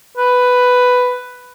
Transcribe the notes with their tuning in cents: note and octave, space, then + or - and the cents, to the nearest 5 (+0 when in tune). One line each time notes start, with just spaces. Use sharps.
B4 +5